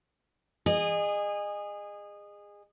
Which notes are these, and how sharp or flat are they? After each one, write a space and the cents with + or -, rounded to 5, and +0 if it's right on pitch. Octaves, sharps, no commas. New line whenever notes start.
G#4 -20 D#5 -30